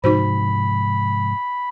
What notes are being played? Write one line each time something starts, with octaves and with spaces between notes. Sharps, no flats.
G#2 C3 F3 D#4 F#4 C5 B5